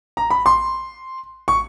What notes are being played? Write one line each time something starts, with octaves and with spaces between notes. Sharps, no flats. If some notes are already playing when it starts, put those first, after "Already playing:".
A#5
B5
C6
C#6